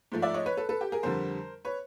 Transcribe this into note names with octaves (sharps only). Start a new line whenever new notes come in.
G#2 F3 A3
D5 E5
C#5 D#5
B4 C#5
A4 B4
A4 B4
G4
G#4 A#4
F2 D3 G3 A#4 C5
B4 C#5